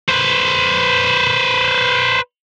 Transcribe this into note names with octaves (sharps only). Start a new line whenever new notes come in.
B4 C5